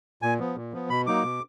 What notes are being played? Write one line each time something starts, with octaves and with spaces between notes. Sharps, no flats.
A#2 G#5
F3 B3
A#2
F3 B3
B2 B5
F#3 A#3 D#4 D6
B2